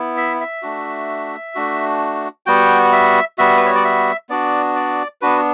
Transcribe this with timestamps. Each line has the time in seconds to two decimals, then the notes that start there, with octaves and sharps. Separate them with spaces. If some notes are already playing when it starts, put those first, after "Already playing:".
Already playing: B3 E4
0.17 E5
0.40 E5
0.62 A3 D4 F#4
1.55 A3 D4 F#4
2.46 G3 B3 F#4 G5
2.93 E5
3.38 G3 B3 F#4 E5
3.57 B4
3.66 C#5
3.75 D5
3.85 E5
4.29 B3 D4 F#4 D5
4.76 D5
5.21 B3 D4 F#4 B4